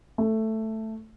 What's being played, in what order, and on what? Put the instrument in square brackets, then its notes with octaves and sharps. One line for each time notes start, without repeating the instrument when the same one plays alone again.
[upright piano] A3